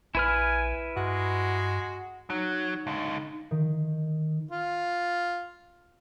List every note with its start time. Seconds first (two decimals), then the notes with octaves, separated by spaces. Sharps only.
0.15 A#1 E4 B4 G#5 F6
0.97 G2 G#3 F#4
2.30 F#3 D#4
2.87 C#2 D3
3.51 D#3
4.51 F4